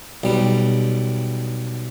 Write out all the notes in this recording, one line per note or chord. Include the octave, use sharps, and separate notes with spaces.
B1 G3